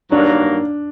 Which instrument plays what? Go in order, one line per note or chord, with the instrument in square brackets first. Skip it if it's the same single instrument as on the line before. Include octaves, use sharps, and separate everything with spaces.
[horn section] G2 D#3 F#3 A#3 [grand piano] D4